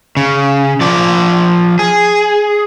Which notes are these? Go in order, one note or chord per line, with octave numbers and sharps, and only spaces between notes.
C#3
F3 D5
G#4